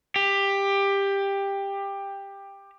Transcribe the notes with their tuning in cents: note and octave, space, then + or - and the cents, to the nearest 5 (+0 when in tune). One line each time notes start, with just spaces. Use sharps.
G4 +15